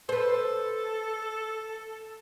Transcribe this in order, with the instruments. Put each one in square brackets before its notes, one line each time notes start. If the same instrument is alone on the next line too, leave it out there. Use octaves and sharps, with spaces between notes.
[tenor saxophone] A4 [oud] B4 C5